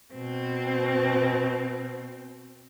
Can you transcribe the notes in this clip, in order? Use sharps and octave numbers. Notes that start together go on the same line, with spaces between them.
B2 C4